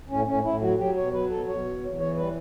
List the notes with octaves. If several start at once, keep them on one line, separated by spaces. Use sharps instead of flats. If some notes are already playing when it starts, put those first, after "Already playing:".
A2 C#4
A2 C#4
A2 E4
F#3 F#4
F#3 G4
B2 C#5
F#3 B4
B2 A4
B2 C#5
E2
E2
E3 C#5
G3 B4